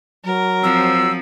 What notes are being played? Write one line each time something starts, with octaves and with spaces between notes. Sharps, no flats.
F#3 A#4
F3 C4 E6